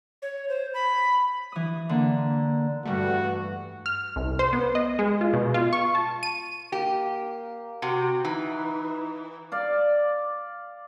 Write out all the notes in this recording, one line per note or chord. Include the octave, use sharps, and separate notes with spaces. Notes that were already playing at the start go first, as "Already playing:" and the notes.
C#5
C5
B5
E3 D#6
D3 A#3
G2 E3 G3 A3 F#4 F#5 A5
F6
C2
C5
B3
D#5
G#3
F4
B2
F4
C#6
A5
D#7
A#3 G4
C3 F#4
E3 D#4
D5 F5